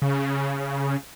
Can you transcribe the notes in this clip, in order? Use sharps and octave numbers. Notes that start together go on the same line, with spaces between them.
C#3